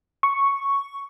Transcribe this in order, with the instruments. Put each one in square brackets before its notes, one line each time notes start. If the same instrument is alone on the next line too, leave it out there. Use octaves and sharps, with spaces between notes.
[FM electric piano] C#6